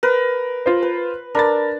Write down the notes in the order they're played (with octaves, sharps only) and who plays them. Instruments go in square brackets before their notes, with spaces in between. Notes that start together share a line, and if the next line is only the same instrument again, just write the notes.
[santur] A#4 B4
[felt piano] F4 C5
[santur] B4
[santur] D4 [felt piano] A#4 B5 A6